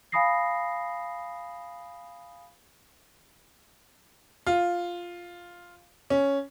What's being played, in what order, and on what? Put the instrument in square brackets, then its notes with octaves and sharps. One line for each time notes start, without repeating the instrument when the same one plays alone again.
[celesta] F5 G#5 B5 D#6 A#6 C7
[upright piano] F4
C#4